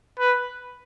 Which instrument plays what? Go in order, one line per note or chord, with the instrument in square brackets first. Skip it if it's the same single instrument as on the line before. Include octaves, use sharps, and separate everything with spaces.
[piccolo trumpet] B4